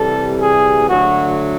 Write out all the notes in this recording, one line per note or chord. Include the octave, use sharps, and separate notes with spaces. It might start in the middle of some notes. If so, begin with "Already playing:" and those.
Already playing: C3 E3 G3 A4
G#4
D3 F#3 A3 F#4